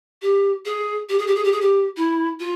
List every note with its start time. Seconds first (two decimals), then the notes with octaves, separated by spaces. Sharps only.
0.22 G4
0.65 G#4
1.09 G4
1.18 G#4
1.27 G4
1.35 G#4
1.44 G4
1.52 G#4
1.61 G4
1.97 E4
2.40 F4